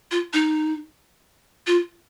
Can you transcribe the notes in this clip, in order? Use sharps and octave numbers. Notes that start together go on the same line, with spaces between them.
F4
D#4
F4